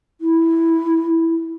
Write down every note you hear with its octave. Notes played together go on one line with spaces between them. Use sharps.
E4